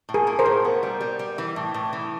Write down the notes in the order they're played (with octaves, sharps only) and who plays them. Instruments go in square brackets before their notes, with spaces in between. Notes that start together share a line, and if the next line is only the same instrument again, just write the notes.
[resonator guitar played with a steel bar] A2
[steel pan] G#4 A#4
[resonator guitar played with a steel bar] A#3
[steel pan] A#4 C5
[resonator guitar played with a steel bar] A2
B3
G3
G3
G3
E3
A2
A2
E3